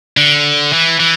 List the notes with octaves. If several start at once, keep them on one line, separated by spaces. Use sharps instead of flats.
D3
E3
E3